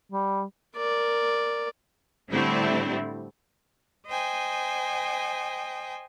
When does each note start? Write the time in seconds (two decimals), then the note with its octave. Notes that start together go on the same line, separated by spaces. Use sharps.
0.12 G3
0.77 A#4 D5
2.30 A2 D3 G3 A3 C4 E4
4.07 C5 D#5 G5 G#5